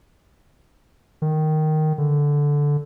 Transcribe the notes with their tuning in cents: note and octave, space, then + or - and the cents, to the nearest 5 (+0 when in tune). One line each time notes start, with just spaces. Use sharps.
D#3 -5
D3 -10